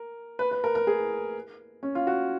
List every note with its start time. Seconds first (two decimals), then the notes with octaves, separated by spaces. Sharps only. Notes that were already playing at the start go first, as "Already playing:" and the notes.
Already playing: A#4
0.39 B4
0.51 B4
0.64 A#4
0.75 A#4
0.87 G#4
1.83 C#4
1.95 F4
2.07 F#4